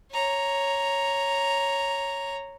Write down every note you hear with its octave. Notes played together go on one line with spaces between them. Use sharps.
C#5 A#5